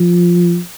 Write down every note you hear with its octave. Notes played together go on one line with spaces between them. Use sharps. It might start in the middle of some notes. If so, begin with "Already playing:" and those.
Already playing: F3